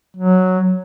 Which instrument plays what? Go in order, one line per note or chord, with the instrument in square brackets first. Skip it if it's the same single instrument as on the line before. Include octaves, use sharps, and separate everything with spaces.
[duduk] F#3